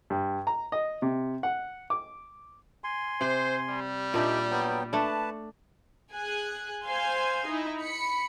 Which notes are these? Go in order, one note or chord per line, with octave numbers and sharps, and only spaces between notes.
G2
A#5
D#5
C3
F#5
D6
G#5 C6
C3 C5
G3
A#2 D4 D#4 G4 E5 G5
F#3 B3 G5
A3 D4 B4 A5
G#4 G#5 F#6
C5 F5 G#5 C6
D#4 E4
B5 C#7